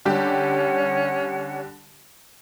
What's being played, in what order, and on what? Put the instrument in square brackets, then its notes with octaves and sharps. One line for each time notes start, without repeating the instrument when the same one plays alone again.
[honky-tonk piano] D3 G3 G4 [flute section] C#4 F#5